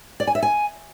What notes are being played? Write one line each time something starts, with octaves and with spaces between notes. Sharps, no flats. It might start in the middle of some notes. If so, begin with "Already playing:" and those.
D5
G#5
E5
G#5